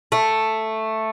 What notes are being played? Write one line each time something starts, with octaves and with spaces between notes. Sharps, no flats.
A3